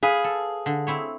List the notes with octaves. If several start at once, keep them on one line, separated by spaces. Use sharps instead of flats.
G#4 B4 F5
A4
D3
C4 E4 C#5